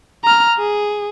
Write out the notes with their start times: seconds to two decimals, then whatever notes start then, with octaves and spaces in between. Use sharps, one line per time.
0.24 A#5 F6
0.58 G#4